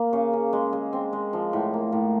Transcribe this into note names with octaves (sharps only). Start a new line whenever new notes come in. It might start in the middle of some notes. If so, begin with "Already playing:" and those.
Already playing: A#3
C#3
C#3
G#3
G#3
C4
G#3
F3
A2
A#3
A2